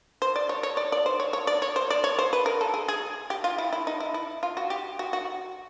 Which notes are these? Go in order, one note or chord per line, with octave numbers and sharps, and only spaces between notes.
C5
D5
C#5
C#5
D5
D5
C5
C#5
C#5
D5
C#5
C5
D5
C#5
C5
B4
A#4
A4
G#4
G#4
G4
F4
E4
E4
D#4
E4
E4
F4
F#4
G4
F#4
F#4